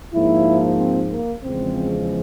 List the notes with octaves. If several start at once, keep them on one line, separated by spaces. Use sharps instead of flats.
G#2 F3 A#3 E4
C4
A#3
E2 C#3 F3 G#3 C4